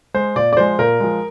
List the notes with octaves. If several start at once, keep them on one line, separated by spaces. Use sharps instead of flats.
G#3 C5
A#2 D5
D5
F3 G#3 C5
A#2 A#4
F3 G#3